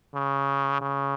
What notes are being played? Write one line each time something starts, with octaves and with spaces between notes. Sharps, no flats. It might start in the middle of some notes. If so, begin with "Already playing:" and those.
C#3
C#3